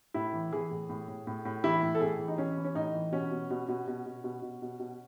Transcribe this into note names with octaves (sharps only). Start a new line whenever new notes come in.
A2 E4
E3
E3 G#4
A2
A2
A2
A2
A2
E3 E4
A2
A4
A2 G#4
E3
D#4
E3 C#4
E3
C#4
A2 D#4
E3
B2 C#4
B2
B2
B2
B2
B2
B2
B2
B2
B2